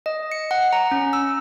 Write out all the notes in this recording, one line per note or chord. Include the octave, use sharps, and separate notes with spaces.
D#5
C#7
F#5
A#5
C#4
E6